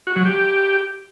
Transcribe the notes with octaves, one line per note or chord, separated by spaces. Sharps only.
F#4
F#3
G4